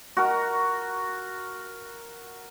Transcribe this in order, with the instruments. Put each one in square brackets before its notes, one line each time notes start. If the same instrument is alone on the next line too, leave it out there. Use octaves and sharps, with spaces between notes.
[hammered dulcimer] F#4 A#4